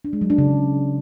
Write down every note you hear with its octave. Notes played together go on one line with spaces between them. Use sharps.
D4
G#3
F#3
D4
C#3